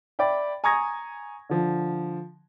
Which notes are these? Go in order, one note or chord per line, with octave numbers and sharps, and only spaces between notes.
D5 E5 G5 B5
G#5 A#5 C#6 D#6 G#6 A#6
D3 F3